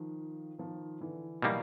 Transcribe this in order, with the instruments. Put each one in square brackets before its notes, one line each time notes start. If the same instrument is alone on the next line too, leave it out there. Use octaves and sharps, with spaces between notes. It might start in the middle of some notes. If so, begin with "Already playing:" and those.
Already playing: [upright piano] D#3 F3
D#3 F3
D3 E3
[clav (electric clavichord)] B2 G3 A#3 [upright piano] E3 F#3